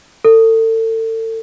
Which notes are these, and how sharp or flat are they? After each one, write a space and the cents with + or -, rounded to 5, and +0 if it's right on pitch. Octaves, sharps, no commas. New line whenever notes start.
A4 +35